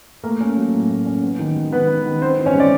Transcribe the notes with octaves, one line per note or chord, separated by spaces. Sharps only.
A3 A#3 A#4
C#4
F#3
A2
A3
C#4
B3
D#3
G#3
D#3 B3 B4
B3
D#3
B3 C4 C5
E3
C#4 C#5
G#3 D5